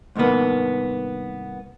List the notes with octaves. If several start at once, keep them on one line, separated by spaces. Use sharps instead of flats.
C2 G#2 D#3 A#3 B3